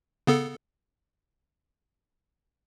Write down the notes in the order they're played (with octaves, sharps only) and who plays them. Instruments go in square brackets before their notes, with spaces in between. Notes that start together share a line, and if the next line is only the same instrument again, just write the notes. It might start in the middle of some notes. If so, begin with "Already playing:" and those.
[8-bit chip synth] C#3 B3 A4